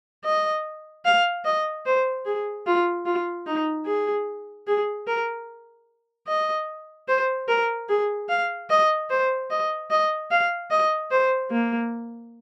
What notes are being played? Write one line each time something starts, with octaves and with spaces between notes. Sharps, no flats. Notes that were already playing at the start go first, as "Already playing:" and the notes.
D#5
F5
D#5
C5
G#4
F4
F4
D#4
G#4
G#4
A#4
D#5
C5
A#4
G#4
F5
D#5
C5
D#5
D#5
F5
D#5
C5
A#3